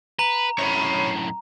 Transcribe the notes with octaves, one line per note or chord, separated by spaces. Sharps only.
B4 A#5
F#2 A2 C#5 B5